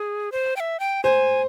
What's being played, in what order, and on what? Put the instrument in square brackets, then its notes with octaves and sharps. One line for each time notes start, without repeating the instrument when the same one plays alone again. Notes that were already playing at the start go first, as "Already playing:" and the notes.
Already playing: [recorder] G#4
C5
G5
E5
G5
[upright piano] C5 [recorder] G#5